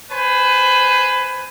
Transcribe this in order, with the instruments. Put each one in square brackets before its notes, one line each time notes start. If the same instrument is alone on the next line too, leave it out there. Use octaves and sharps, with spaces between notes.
[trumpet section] B4 C5 G#5 B5